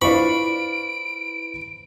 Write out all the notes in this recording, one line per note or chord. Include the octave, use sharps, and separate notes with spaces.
D4 E4 F4 B4 C5 B5 C#6 D7